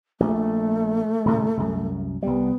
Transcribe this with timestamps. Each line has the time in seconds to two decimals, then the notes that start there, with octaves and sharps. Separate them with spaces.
0.20 A#1 A3
1.25 D#1 A2 C#3
1.57 C2 F#2
2.23 C2 G3 B3